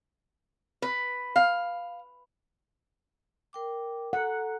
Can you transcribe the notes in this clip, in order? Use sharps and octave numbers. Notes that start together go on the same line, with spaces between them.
B4
F5
A#4 G5 D6
A4 F#5 A#5